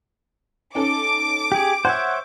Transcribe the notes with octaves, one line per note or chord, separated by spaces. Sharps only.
C#4 D#4 A4 D6
G4 G#4
C5 C#5 E5 F#5